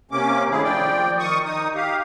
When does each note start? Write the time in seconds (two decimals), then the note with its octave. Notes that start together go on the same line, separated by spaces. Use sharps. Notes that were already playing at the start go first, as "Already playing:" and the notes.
0.11 C3 A#3 C#4 D6
0.50 G2 D#3 A3 E4 G#4
0.63 F3 D5 G5
1.19 D#3 C#6 D#6
1.45 D#4 D#6
1.75 G4 F5